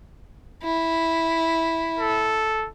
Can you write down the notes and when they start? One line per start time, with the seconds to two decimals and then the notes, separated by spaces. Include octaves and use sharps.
0.64 E4
1.99 A4